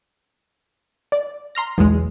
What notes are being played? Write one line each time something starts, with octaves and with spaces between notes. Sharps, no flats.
D5
A#5 C6 F6 A#6
B1 E2 G#3